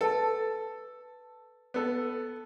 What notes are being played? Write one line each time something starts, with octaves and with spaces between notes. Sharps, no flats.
A4 B4 A5
B3 A4